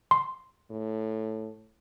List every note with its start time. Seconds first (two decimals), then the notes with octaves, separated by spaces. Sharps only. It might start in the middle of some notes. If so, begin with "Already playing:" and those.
0.11 C6
0.70 A2